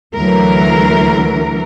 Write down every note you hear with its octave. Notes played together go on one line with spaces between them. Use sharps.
D2 E3 F#3 A#4